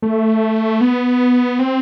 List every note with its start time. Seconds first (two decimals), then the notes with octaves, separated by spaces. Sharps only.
0.02 A3
0.81 B3
1.59 C4